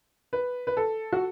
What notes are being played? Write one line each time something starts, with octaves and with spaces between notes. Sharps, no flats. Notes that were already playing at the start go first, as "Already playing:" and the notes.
B4
B4
A4
F#4